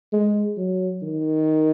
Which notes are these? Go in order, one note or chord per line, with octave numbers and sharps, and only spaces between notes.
G#3
F#3
D#3